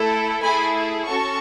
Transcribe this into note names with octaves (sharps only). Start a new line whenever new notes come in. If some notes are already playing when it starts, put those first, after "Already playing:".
Already playing: A3 E4 A4
A3 E4 G#4 G#5 B5
C#4 F#4 A4 A5 C#6